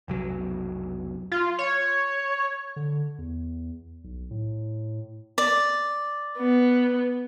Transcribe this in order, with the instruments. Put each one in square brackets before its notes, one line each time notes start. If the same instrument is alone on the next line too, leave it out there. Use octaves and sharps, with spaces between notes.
[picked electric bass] F1 B1 F#3
[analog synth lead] F4
C#5
[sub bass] D3
E2
B1
A2
[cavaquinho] D5
[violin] B3